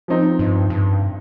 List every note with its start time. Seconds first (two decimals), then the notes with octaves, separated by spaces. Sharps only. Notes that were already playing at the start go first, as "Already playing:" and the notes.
0.08 F3 C4 D#4
0.39 G2
0.70 G2